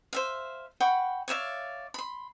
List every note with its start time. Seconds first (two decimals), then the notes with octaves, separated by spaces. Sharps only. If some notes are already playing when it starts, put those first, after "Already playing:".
0.13 C5 E5 F5
0.81 F#5 G5 B5 C#6
1.28 C#5 D5 E5 F5
1.94 B5 C6